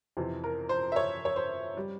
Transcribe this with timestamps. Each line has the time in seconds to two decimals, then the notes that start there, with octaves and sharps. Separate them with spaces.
0.17 F2 C3 E3
0.44 A#4
0.69 C5
0.92 E5
0.96 C#5
1.25 C#5
1.36 C5
1.77 G3